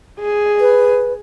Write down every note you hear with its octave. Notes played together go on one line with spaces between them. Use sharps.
G#4
B4